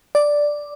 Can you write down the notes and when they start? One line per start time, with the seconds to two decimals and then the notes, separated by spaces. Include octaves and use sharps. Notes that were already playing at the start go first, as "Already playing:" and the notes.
0.15 D5